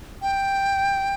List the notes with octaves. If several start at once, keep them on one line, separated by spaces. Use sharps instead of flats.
G5